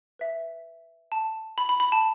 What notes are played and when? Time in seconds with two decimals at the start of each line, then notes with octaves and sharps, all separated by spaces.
0.19 B4 E5
1.12 A5
1.58 B5
1.69 B5
1.80 B5
1.92 A5